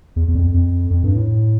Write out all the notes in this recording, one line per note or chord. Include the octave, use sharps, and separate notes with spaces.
E2
E2
F2
F2
F2
G2
A2